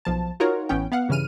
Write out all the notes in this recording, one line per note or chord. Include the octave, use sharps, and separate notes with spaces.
B1 F3 A5
D#4 F4 F#4 A#4 C#5
A1 E3 B3 C#4 G5
B3 F5 F#5
G2 C#3 E3 F6 D#7